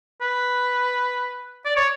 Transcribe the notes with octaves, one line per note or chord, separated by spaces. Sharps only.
B4
D5
C#5